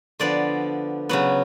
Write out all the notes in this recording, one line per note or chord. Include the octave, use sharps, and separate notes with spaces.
D3 F3 B3 D4 D5
C#3 F#3 B3